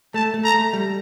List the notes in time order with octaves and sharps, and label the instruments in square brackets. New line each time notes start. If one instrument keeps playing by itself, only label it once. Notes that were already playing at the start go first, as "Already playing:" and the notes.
[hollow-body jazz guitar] A3 [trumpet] A5
[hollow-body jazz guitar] A3
[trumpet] A#5
[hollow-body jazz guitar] A3
G3